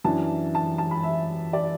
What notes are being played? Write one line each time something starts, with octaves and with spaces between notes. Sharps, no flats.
F#2 E3 D4 A5
A5
A5
B5
E5
D5